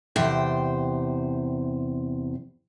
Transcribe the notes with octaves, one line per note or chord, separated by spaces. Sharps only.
E2 C3 C5 G5